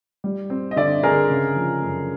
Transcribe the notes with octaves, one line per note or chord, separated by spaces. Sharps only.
G3
C4
D#5
D3 D5 E5
D3 G#4 A#4
C#3
F3
F#2